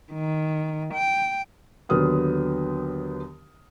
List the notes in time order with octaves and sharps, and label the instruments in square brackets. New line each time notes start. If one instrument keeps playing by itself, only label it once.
[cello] D#3
G5
[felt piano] D#2 D3 F#3 B3 D#6 F6